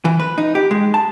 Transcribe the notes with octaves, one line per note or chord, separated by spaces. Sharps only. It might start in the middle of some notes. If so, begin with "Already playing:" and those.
E3
B4
D#4
G4
G#3
A5